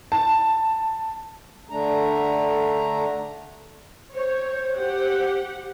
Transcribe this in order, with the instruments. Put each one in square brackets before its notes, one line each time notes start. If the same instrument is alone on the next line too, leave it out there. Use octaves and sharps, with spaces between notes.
[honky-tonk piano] A5
[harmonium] D3 A3 D4 A#5
[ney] C5 [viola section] C#5
[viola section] G4 F#5